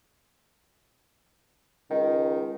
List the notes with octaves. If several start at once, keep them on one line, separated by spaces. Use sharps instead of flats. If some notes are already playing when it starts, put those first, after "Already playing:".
C#2 D#3